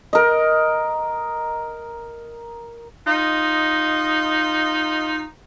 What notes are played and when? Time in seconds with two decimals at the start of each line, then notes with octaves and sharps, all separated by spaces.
0.13 A#4 D#5
3.07 D#4 F4 D#5